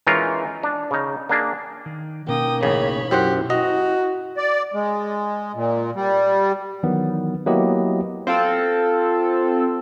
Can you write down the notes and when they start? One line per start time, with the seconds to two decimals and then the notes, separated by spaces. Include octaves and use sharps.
0.07 E3 G#3 C#4 D#4 F4 A#4
0.63 D4
0.91 C#3 D#4
1.29 A#3 D4 G#4
1.86 D#3
2.28 B2 A#3 C#4 D#4 G5 D#6
2.63 A1 C#3 C#5 B5
3.11 F#2 E4 G4 C5 F#5
3.50 F#4 D#5 A#5
4.37 D5
4.74 G#3
5.55 A#2
5.95 G3
6.83 D#3 E3 F#3 B3
7.46 F#3 A#3 B3 E4 G4 D#5
8.27 C4 F4 A4